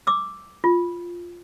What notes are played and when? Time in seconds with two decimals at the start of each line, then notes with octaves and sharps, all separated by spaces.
0.07 D6 E6
0.64 F4